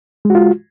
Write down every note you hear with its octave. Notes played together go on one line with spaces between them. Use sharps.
G#3 F4 F#4